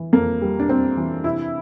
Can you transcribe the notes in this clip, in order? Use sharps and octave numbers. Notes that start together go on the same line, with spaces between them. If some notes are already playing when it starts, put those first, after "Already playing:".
Already playing: E3
F2 A#3
G3
D4
G3 C4
E3
C3 E4